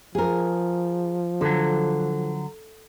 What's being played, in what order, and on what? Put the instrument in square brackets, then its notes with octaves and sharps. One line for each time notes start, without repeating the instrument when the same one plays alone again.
[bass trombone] F3 [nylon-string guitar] G#4 A#4
[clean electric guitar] D3 F#3 [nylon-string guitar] A4